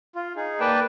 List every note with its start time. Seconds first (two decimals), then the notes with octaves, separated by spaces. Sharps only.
0.15 F4
0.36 D#4 G#4
0.60 A#3 B4 D5 G5 A5